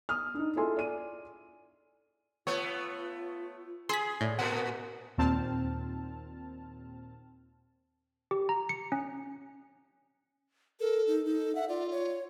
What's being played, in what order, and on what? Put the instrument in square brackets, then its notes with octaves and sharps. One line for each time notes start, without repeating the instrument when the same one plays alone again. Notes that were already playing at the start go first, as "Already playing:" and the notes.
[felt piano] D#6 F6
D4 D#4
E4 F4 G#4 A4 G#5 C6
D5 D#7
[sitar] A3 B3 [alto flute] F4 [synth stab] C#5
[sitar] G#4 [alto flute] G#5 [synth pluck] C6 B6
[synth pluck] A2 [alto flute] D5
[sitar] A#2 [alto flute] A#4 [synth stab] F#5
[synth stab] D#2 A#2 C4 A5 F6
[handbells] G4
A#5
C#7
C#4
[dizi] A4 [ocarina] A#4
[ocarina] D#4
[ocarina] D#4 [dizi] A4
[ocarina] E5 [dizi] F#5
[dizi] F4 [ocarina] D5
[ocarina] C#5